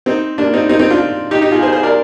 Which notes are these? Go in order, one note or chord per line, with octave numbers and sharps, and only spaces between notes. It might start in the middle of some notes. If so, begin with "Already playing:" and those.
C4 D#4
A#3 D4
C4 D#4
C4 D#4
C4 D#4
D4 F4
D#4 G4
D#4 G4
F4 G#4
G#4 C5
G#4 C5
A#4 D5